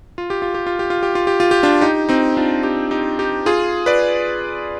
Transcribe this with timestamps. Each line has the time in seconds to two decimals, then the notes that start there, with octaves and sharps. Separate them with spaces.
0.18 F4
0.30 G4
0.42 F4
0.54 G4
0.66 F4
0.79 G4
0.90 F4
1.03 G4
1.15 F4
1.27 G4
1.40 F4
1.51 G4
1.63 D4 F4
1.81 D#4 G4
2.09 C4 D#4
2.37 D4 F4
2.63 D#4 G4
2.91 D#4 G4
3.19 D#4 G4
3.46 F4 G#4
3.86 B4 D5